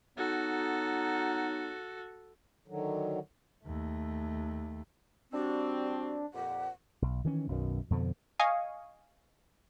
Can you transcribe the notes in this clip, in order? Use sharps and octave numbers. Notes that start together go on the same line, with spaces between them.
F#3 B3 D#4 F#4 A4
D3 D#3 F#3
D#2 A3
G3 C4 D4 F#4
F2 A#2 G4 F#5
B1
D#3 E3 C#4
B1 F#2 B2 D#3
F2 B2 D3 F3
D#5 F5 G#5 C#6 D#6